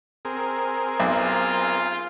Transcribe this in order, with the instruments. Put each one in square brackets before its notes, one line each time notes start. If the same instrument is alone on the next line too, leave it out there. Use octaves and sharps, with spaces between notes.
[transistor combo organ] C4 G#4 A#4
[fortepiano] B1 [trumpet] F4